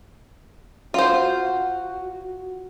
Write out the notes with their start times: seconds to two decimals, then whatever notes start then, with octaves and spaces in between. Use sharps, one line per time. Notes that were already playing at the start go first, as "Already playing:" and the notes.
0.94 F4 F#4 C5